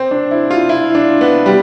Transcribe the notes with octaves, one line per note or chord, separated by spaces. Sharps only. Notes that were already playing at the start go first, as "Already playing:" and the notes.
Already playing: C4
D4
E4
F4
E4
D4
B3
G3